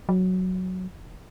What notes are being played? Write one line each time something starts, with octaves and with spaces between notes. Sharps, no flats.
F#3